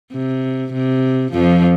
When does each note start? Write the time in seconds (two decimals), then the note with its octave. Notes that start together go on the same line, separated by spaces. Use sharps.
0.12 C3
0.73 C3
1.32 F2 F3